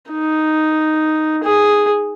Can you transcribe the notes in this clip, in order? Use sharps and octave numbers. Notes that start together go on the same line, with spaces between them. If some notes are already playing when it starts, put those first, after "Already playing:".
D#4
G#4